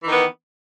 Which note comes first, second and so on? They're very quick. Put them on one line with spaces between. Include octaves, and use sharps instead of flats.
E3 D#3 B3